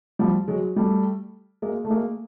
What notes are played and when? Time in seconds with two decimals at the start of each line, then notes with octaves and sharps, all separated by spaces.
0.19 F3 G3
0.48 F#3 G#3
0.76 G3 A3
1.62 G#3 A#3
1.85 A3
1.90 G#3 A#3